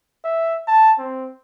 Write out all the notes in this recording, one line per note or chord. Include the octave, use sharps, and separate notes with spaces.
E5
A5
C4